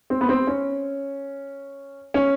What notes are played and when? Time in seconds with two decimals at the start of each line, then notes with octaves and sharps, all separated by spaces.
0.10 C4
0.21 B3
0.29 C4
0.47 C#4
2.14 C#4